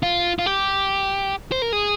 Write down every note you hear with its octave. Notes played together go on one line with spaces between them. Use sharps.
F4
F4
G4
C5
A#4
G#4